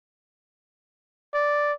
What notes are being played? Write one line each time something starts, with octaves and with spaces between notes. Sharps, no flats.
D5